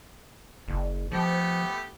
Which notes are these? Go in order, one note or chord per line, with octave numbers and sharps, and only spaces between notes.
F#1
F3 A3 B3 G4